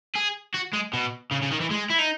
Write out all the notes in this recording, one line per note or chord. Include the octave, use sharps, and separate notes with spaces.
G#4
F#4
G#3
B2
C#3
C#3
D#3
E3
G#3
E4
D#4